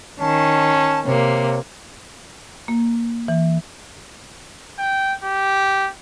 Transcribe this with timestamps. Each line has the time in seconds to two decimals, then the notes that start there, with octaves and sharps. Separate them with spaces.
0.19 D#3 C#4 A5
1.05 C3 A#3 C#5
2.68 A#3
3.28 E3
4.79 G5
5.24 G4